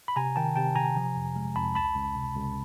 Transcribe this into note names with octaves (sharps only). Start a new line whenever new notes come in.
B5
C3 G#5 A#5
D#3 G5 A5
C3 G5 A5
C3 G#5 A#5
F3
F2
G#3
F2 A5 B5
C#2 A5 B5
C#2
C3
C#2